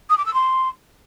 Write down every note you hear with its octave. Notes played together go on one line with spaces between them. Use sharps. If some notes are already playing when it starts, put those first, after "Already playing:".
D#6
D6
E6
C6